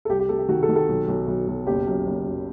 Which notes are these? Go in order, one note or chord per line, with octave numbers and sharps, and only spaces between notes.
A4
C2 G4
G4
C3 A4
G4
D#3 F#4
A4
D#3
A4
B1
B1
B1
B1
F#1 G4
F#2
F#1
F#2